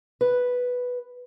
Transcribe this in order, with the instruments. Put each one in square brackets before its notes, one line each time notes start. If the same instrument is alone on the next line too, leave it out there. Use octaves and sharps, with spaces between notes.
[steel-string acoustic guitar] B4